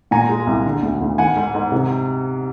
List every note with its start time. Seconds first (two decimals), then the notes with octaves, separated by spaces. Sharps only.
0.11 A#2 G#5 A#5
0.29 G#3
0.47 C2
0.66 D3
0.82 D2
1.01 D2
1.18 D#3 F#5 G#5
1.36 G#2
1.55 G#2
1.72 C3